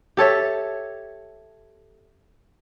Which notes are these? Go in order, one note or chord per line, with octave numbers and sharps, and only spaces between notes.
G4 A4 C#5 E5